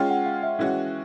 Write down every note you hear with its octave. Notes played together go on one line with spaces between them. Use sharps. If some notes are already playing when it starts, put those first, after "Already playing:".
Already playing: G#3 C#4 F4 G5
F#5
F5
E5
E3 G#3 C#4 F#4